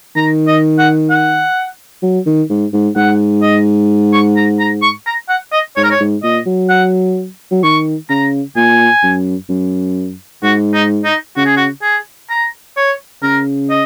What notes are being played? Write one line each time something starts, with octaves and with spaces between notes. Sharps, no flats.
D#3 A#5
D#5
F#5
F#5
F#3
D#3
G#2
G#2
G#2 F#5
D#5
C#6
A#5
A#5
C#6
A#5
F#5
D#5
G#2 C#5
A#4
C#5
G#2
A#2 D#5
F#3
F#5
F#3
D#3 C#6
C#3 A#5
A#2 G#5
F#2
F#2
G#2 F#4
D#4
D#4
C#3 F#4
G#4
F#4
G#4
A#5
C#5
C#3 A#4
D#5